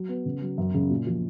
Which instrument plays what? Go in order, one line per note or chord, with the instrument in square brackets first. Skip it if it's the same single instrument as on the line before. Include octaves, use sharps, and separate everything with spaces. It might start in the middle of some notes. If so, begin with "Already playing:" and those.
Already playing: [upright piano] F#3
B3
C#3
F#3
F#2
C#3
A#2
F3